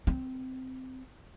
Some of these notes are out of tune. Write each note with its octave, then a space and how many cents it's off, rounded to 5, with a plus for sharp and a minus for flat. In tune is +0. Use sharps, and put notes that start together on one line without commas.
C4 -15